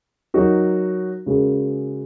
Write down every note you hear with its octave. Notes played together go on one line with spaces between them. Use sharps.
F#3 D#4 F#4 A#4
C#3 G#3 F#4 A#4